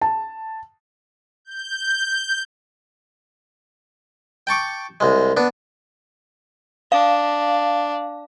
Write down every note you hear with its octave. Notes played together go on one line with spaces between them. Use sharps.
A5
G6
G5 A5 C#6 D6
C2 G#3
B3 D4
D4 F5